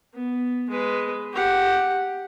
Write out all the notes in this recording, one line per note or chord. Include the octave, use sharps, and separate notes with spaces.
B3
G#3 B4
G4 F#5